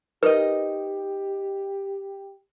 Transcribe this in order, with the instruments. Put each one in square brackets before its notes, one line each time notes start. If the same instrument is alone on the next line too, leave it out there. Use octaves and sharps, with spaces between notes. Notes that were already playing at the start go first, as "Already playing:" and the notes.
[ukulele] D#4 D#5 [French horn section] G4 [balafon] A#4 [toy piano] B4